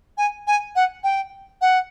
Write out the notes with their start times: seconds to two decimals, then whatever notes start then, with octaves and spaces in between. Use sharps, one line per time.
0.18 G#5
0.47 G#5
0.76 F#5
1.04 G5
1.61 F#5